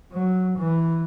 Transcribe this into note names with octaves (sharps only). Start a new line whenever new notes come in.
F#3
E3